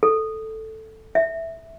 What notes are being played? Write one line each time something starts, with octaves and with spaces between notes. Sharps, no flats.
A4
E5